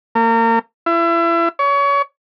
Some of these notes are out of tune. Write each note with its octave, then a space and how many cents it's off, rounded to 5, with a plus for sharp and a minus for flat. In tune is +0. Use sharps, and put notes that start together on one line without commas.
A#3 -35
E4 +35
C#5 +30